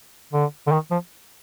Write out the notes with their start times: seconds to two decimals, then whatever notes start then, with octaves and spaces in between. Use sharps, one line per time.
0.33 D3
0.67 D3
0.72 D#3
0.91 F3